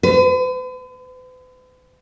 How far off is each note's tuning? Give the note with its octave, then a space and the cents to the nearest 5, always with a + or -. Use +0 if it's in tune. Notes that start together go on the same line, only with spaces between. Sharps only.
B4 +45